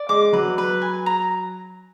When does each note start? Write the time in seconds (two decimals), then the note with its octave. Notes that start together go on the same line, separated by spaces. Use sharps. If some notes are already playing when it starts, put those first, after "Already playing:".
Already playing: D5
0.09 G#3 D6
0.33 F#3 B4
0.58 B4
0.82 G#5
1.06 A#5